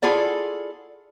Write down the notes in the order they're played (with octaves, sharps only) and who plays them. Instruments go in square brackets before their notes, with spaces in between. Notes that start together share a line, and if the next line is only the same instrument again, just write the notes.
[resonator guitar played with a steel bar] E4 F4 G#4 A4 D5 F#5